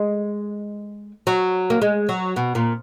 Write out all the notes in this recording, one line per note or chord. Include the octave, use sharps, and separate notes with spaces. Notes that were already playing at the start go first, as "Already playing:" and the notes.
Already playing: G#3
F#3
A#3
G#3
F#3
B2
A#2